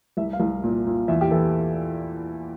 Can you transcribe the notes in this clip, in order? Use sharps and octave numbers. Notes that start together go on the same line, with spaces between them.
C2 E5
F5
C2
A#2
A#2
E2 E5
G4
E3 A4